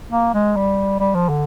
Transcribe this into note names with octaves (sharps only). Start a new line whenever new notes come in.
A#3
G#3
G3
G3
F3
D3